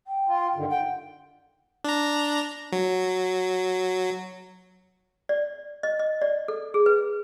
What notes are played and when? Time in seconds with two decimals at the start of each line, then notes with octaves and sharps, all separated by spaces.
0.07 G5
0.27 F4
0.55 G2 D3 D#3
0.71 F#5 G5
1.84 D4 A#5
2.72 F#3
5.29 D5
5.83 D#5
5.99 D#5
6.22 D5
6.48 A4
6.74 G#4
6.86 B4